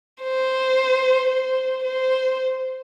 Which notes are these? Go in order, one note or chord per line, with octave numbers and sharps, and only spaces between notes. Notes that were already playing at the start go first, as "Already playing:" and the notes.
C5
C5
C5